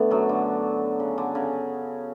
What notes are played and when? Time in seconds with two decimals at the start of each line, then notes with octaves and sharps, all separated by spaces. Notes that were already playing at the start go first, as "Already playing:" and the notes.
Already playing: D3 A3 B3 D4
0.11 F#2 F#3
0.29 D3
1.00 C#3
1.18 D3
1.35 C#3